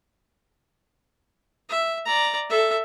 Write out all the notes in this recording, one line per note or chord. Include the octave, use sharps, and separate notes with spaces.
E5
D5 A#5
A4 E5